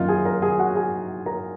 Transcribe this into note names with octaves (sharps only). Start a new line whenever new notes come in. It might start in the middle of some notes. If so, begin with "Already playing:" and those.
Already playing: F#2 D#3 A#3 C#4 D#4 F4 D#5 F5
G#4 G#5
A#4 A#5
G#4 G#5
F#4 F#5
G#4 G#5
A#4 A#5